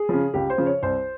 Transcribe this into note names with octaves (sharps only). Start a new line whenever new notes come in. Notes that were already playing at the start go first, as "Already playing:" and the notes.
Already playing: G#4
C#3 F3
C#2 G4
C5
C#3 F3
C#5
C2 C5